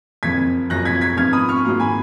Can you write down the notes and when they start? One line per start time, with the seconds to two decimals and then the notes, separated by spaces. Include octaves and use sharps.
0.23 F#1 F2 F3 G#6 B6
0.70 F#1 F#2 F3 F#6 A#6
0.85 G#6 B6
1.01 G#6 B6
1.17 G#2 F3 B3 F6 G#6
1.33 B5 D#6
1.49 C#6 F6
1.64 G#2 F#3 A#3
1.80 G#5 B5